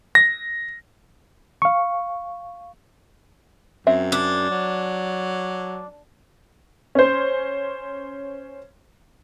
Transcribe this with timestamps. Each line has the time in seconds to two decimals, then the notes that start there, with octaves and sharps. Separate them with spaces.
0.15 A#6
1.62 F5 C#6
3.87 F#2 C4 E5
4.12 D4
4.50 F#3
6.95 C#4 C5